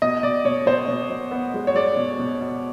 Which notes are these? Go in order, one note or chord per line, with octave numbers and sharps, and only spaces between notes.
B2 D#5
B2 D5
B2 C#5
B2 C5
B2
B2
B3
G#3
C#5
G#3 D5
B2
B2
B2